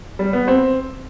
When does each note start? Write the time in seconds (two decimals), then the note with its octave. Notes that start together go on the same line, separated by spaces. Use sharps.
0.19 G3
0.33 B3
0.48 C4